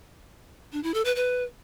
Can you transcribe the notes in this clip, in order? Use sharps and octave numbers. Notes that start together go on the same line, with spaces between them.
D4
E4
A4
B4
B4